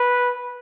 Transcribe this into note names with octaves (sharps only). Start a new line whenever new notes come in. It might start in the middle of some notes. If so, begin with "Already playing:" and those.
Already playing: B4